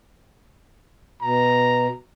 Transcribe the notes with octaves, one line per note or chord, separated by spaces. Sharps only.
B2 A#5